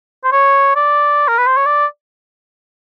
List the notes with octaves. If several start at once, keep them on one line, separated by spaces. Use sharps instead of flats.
C5
C#5
D5
A#4
B4
C5
C#5
D5